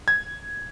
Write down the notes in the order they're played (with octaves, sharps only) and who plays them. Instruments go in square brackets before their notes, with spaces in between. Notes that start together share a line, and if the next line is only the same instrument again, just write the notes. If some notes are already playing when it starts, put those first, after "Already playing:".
[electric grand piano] G#6